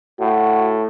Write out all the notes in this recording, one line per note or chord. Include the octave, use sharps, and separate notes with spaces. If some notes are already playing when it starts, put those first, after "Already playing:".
A2 F#4